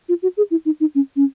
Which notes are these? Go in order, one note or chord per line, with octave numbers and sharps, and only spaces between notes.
F4
F#4
G#4
E4
D#4
D#4
C#4
C#4